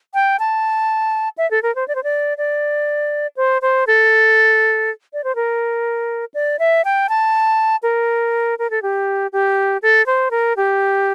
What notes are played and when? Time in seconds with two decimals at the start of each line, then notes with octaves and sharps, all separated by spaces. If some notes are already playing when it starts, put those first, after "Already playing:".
0.14 G5
0.39 A5
1.38 E5
1.51 A4
1.63 A#4
1.75 C5
1.88 D5
1.95 C5
2.04 D5
2.38 D5
3.37 C5
3.62 C5
3.87 A4
5.13 D5
5.24 C5
5.36 A#4
6.34 D5
6.59 E5
6.85 G5
7.09 A5
7.83 A#4
8.59 A#4
8.70 A4
8.82 G4
9.33 G4
9.82 A4
10.06 C5
10.31 A#4
10.57 G4